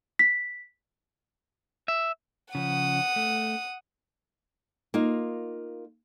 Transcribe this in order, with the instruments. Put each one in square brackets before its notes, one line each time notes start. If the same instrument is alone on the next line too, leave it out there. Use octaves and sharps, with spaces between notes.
[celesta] B6
[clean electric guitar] E5
[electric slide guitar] C#3 F3 [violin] F#5 D#6
[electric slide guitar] A3
[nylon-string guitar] A#3 D#4 F4